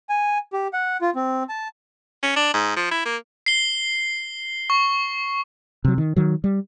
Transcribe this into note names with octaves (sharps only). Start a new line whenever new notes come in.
G#5
G4
F#5
F4
C4
A5
C#4
D4
G#2
F3
E4
A#3
C7 G7
C#6
C3 F#3
D#3
D#3 F#3
G3